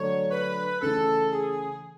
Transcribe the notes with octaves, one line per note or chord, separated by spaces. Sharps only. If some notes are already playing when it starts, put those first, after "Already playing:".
Already playing: D3 F#3 A3 D4 F#4 C#5
B4
C#3 E3 A3 A4
G#4